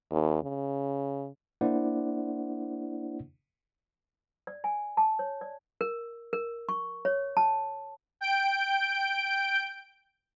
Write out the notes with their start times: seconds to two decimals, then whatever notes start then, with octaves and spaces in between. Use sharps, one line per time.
0.11 D#2
0.43 C#3
1.61 A#3 D4 E4 C5 D5 F#5
4.47 D5
4.64 G#5
4.97 A5
5.19 C#5
5.41 D5
5.81 A#4
6.33 A#4
6.69 C#6
7.05 C#5
7.37 A5
8.21 G5 G6 D7